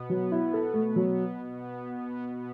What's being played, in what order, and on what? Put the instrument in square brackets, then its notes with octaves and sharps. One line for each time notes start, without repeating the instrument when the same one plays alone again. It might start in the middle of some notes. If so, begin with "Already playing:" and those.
Already playing: [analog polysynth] B2 B3
[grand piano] F#3
E4
A4
A3
F#3